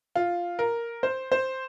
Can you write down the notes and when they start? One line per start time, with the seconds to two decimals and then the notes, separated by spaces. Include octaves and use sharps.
0.15 F4
0.59 A#4
1.03 C5
1.32 C5